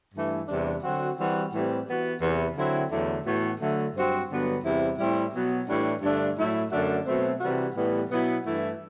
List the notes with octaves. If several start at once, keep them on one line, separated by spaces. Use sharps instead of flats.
G2 E3 A3
E2 C3 G3 D4
D3 F#3 C4 F#4
E3 G3 C4 F#4
A2 E3 G3 C4
E3 B3 F#4
E2 C3 E3
D3 F#3 C4 E4
E2 D3 F#3 A3 E4
A2 E3 B3 F#4
D3 F#3 A3
G2 F#3 C4 F#4
G2 D3 F#3 B3 F#4
E2 C3 G3 C4 E4
A2 G3 C4 E4
B2 F#3 B3
A2 E3 G3 D4
G2 D3 A3 D4
A2 F#3 A3 E4
F#2 D3 A3 D4 F#4
B2 F#3 A3 C4
C3 E3 G3 C4 F#4
A2 E3 G3 B3
B2 F#3 B3 E4
G2 E3 A3 E4